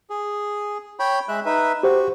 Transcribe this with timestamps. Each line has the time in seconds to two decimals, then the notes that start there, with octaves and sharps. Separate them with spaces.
0.10 G#4
0.99 C#5 G5 B5
1.28 G#3 E5 F#6
1.45 D#4 B4 E5
1.83 F#4 G4 C5